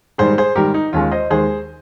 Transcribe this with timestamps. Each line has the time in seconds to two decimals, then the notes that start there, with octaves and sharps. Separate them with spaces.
0.18 G#2 D#3 G3 G#4 C5
0.38 G#4 C5
0.56 G#2 D#3 G3 G4 A#4
0.74 D#4
0.93 D#2 D#3 G#3 C#4 F4
1.12 C5 D#5
1.30 D#2 D#3 G#3 G#4 C5